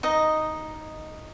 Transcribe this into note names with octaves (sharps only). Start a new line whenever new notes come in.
D#4 D#5